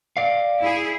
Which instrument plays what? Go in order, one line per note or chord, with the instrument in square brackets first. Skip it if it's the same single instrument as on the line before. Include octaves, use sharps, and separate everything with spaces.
[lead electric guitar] D5 F5
[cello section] E4 G#4